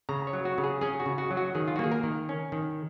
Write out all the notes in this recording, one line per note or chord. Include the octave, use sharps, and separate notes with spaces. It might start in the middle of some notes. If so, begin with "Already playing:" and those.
C#3 A#5
C#5
F#3
F#4
C#3
G#4
C#4 G#4
F#4
C#3
F#4
F#3
F#4
D#3 G#4
F4
F#4
A#3 G#4
A#4
D#3
C#4
D#3